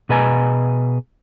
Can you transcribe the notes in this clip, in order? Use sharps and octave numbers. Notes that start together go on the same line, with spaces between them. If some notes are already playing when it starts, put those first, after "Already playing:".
B2 G#4 B4 D#5 G#5 A#5